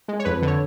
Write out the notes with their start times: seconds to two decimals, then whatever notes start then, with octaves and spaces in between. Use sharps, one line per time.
0.08 G#3
0.19 C#5
0.25 F2 B4
0.42 D3
0.47 C#5